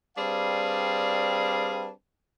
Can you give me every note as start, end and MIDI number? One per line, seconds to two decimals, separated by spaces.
0.17 1.89 55
0.17 1.89 60
0.17 1.89 62
0.17 1.89 68
0.17 1.89 71
0.17 1.89 77